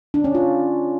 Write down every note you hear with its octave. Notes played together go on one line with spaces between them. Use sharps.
D4
C#4
F4